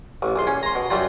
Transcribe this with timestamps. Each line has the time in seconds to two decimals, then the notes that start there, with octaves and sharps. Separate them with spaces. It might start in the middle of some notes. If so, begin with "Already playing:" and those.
0.22 A1
0.36 A#1 C6
0.47 C#4
0.63 A#5 C6
0.75 B2
0.90 F#2 F#3 G3 F4